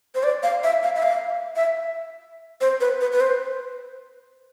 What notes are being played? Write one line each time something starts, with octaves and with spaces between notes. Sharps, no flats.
C5
D5
F5
E5
F5
E5
F5
E5
C5
B4
B4
B4
C5